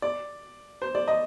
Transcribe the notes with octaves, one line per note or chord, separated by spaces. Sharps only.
D5
C5
D5
D#5